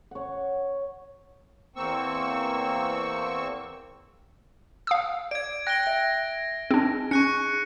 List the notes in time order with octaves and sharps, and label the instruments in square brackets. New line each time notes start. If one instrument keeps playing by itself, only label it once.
[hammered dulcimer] C#5 F#5
[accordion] E2 A#3 C4 C#6 E6
[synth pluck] F5 D#6 E6
[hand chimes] D5 [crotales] G#6 D7
[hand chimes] G5 F#6 [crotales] A#6 D7 G7
[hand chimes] E5
[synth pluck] C4 D4 [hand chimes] D#4 G#4
[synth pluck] C#4 [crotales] C#6 F#6 C#7